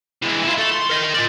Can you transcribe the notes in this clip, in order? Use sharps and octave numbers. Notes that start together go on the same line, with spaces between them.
E3 G#3
E4 F4
A3 A4
C6
A#4 D#5
F4 D5